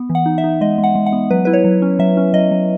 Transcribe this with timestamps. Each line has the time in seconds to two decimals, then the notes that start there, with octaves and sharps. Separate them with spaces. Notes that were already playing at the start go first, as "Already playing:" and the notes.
Already playing: B3
0.10 E3
0.15 F#5
0.26 D#4
0.38 E5
0.44 D#4
0.61 G#3 D#5
0.78 G#3
0.84 F#5
0.95 G#3
1.06 F#5
1.13 B3
1.31 F#3 B4
1.45 E4 B4
1.53 C#5
1.64 F#3
1.82 C#4
1.99 F#3 E5
2.17 C#4
2.33 F#3 D#5
2.51 F#3